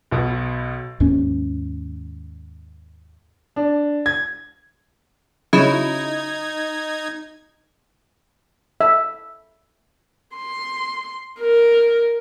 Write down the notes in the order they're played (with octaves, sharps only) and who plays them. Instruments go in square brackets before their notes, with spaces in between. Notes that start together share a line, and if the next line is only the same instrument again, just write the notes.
[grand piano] B1 B2
[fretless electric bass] D#2 G#2 A#3 C#4
[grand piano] D4
G#6
[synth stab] C#3 F#3 E4 [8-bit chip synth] D#4 G#6
[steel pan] E5
[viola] C6
A#4